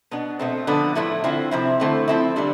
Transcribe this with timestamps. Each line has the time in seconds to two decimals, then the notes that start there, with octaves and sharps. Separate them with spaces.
0.11 B2 B3 D4
0.39 B2 A3 C4
0.67 D3 F3 B3 D4
0.95 A2 F3 A3 E4
1.24 D3 F3 C4 E4
1.51 C3 F3 C4 E4
1.80 D3 A3 C4 E4
2.08 F3 C4 E4
2.36 D3 G3 D4